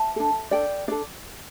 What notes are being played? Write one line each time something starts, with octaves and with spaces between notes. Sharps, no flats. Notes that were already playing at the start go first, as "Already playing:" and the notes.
Already playing: E5 A5
D4 A4
D4 A4 D5 G5
D4 A4 D5